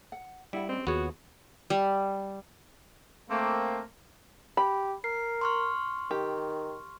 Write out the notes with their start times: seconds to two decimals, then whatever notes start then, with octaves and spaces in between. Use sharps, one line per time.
0.12 F#5
0.53 G3 D4 E4 F#5
0.69 C4 C#4 G4 D#5
0.87 D#2 B3 F4 F#4 G#4 C#5
1.70 G3
3.29 A3 A#3 C4
4.57 G4 B5
5.04 A#4 C7
5.41 C6 C#6 F6
6.11 D#3 G4